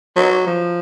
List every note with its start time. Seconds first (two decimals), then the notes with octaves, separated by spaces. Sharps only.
0.16 F#3
0.47 F3